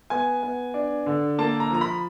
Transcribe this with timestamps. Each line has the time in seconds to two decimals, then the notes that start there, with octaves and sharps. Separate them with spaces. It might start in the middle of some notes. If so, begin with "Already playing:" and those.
0.10 B3 G#5
0.43 B3
0.74 D4
1.06 D3
1.38 A#3 A5
1.60 A#5
1.70 F3 A#5
1.81 B5